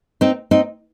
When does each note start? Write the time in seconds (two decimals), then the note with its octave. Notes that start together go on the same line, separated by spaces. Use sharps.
0.21 C4 D#4
0.51 C4 D#4